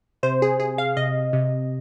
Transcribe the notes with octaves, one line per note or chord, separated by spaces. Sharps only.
C3 C5
G#4
C3 G#4
F5
C3 D#5
C3